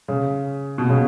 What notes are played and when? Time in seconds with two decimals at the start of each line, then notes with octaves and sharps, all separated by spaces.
0.08 C#3
0.78 B2
0.89 C#3